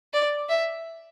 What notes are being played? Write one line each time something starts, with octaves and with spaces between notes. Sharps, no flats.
D5
E5